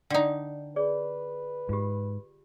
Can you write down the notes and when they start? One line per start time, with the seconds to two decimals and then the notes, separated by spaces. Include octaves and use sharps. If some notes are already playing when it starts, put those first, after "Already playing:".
0.10 D3 D#4 D5 G5
0.76 G#4 B4 C#5 D5
1.69 G#2 F4 G4